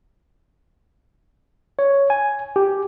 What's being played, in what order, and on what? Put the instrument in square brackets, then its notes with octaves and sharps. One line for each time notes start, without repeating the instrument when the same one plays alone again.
[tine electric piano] C#5
G#5
G4